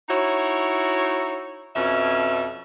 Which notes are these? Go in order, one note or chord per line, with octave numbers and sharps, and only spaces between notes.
D#4 E4 F#4 C#5
F2 B2 C#4 E5